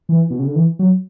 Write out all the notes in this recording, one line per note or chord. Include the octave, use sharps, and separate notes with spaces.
E3
B2
C#3
D3
E3
F#3